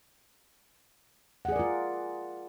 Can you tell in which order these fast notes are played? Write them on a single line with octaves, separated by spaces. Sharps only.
F#5 G#4 D5 A#4 F4